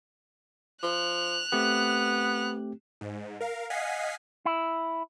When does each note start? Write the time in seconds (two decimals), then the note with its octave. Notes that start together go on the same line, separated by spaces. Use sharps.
0.83 F3 F#6 F7
1.52 A3 B3 C4 G4
3.01 G#2
3.40 A#4 F5
3.70 D#5 F5 F#5 G#5 B6 C7
4.45 E4